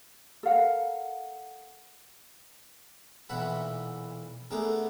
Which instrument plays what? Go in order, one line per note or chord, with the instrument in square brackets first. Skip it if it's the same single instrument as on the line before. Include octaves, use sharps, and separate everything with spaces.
[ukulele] A4 A#4 F5 F#5
[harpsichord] B1 A#2 E3 E4 F#5 B5
A3 B3 D4 G#4 A#4